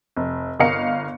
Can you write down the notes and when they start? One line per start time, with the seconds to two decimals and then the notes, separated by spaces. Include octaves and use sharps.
0.16 F1
0.60 G1 A#4 D#5 F5 C#7